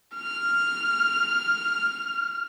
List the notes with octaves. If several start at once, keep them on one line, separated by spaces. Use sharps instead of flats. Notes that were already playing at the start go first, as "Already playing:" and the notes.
F6